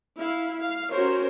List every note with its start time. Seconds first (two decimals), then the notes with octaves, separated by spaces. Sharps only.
0.17 E4 F5
0.61 F5
0.92 C#4 F#4 G4 A#4 C5 C#5